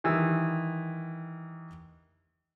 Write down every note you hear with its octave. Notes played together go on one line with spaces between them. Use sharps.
D#3 E3 G3 E6